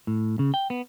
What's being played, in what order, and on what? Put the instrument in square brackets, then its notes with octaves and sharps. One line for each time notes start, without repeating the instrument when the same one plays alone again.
[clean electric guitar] A2
C#3
G5
B3